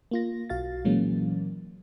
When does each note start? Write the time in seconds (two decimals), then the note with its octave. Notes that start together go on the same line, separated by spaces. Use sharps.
0.11 A#3 F4 A#6
0.49 B1 F#4 F5 A6
0.85 A#2 E3 F#3 G#3 A#3 C#4